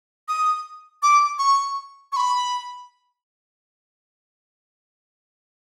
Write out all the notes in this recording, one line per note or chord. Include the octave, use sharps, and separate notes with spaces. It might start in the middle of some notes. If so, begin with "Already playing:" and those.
D#6
D6
C#6
C#6
B5